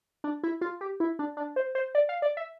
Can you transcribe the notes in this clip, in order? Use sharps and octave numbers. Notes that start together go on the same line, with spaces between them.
D4
E4
F4
G4
E4
D4
D4
C5
C5
D5
F5
D5
E5